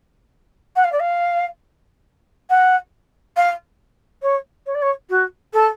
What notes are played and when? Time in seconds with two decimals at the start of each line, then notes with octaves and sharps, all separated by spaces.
0.76 F#5
0.84 F5
0.92 D5
1.01 F5
2.50 F#5
3.37 F5
4.22 C#5
4.66 C#5
4.75 D5
4.82 C#5
5.10 F#4
5.53 A4